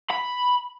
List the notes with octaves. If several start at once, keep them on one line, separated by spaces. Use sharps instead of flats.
B5